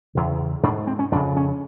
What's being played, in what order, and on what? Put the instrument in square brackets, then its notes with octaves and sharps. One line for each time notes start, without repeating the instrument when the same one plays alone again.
[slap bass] E2 C#3
G#2 D4
C4
C#4
F2 D4
C#3
C#4